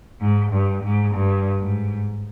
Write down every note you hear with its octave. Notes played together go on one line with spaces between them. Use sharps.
G#2
G2
G#2
G2
G#2